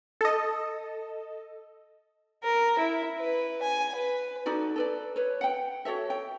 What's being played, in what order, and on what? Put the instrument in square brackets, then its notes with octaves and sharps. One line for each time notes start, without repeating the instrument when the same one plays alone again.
[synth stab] A4 D#5
[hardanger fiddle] A#4
E4
B4
G#5
B4
[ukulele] D#4 F#4 A4 D5
A4 B4 D5
B4 C#5
F#5 G5
F#4 A4 C#5 E5
G5